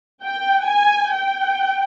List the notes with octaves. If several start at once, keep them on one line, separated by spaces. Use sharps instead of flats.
G5
G#5
G5